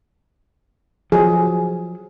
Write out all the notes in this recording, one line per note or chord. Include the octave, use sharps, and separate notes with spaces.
F3 F#3 G#4